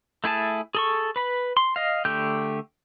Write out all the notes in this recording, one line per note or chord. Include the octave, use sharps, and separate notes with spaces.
A3 E4 G#4 A5
G#4 A4 C#6
B4 B5
C6
D#5 F5
D3 A3 G4 G6